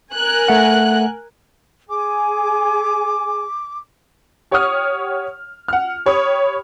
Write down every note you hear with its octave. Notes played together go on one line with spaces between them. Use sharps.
A#4 G#5 F#6
A3 F#5
G#4 G#5 D6
G4 C#5 F#5 C#6 D#6 F6
F#5 F6
G4 C#5 B5 D#6